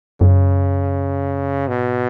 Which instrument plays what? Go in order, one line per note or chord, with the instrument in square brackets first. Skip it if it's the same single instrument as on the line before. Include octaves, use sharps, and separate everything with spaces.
[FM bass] F#2 [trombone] C#3
[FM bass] G#2 [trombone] B2